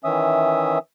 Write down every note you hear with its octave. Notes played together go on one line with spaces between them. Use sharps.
D#3 E3 C#4 E5 D#6